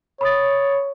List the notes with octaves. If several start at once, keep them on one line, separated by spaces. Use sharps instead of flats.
C#5 B5 D#6 A6